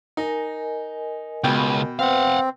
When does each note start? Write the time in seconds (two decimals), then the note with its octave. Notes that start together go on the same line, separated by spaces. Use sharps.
0.17 D#4 A#4 D#5 G#5
1.44 C#2 B2 G5
1.99 C4 B4 C5 F5 F#5